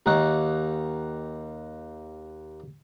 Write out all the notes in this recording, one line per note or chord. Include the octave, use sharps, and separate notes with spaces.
D#2 D#4 F#5 C#6